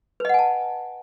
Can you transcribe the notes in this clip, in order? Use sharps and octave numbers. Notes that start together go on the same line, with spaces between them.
B4 D#5 F#5 G#5 A5